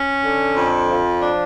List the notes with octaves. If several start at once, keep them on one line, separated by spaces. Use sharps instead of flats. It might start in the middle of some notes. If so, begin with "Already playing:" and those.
Already playing: C#4
D3
F2
F3
D4